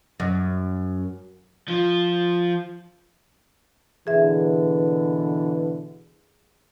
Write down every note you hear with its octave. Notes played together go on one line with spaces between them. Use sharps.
F#2
F3
B2 D3 E3 G#4 E5